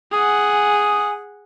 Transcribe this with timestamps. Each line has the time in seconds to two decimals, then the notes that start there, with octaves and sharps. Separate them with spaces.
0.13 G#4 F#5 G#5 D#6